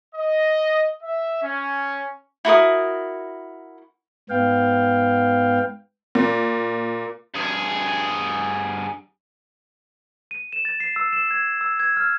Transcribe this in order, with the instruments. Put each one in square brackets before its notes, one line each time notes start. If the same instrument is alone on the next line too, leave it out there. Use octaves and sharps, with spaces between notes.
[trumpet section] D#5
E5
C#4
[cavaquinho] E4 F#4 A#4 D#6
[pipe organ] G#2 B3 F5 G5
[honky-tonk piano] A#2
[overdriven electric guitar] G2 G#4
[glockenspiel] D#7
E7
A6
C7
E6
E7
G#6
E6
G#6
F6